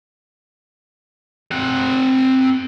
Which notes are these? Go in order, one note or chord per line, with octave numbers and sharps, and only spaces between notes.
C4 F#5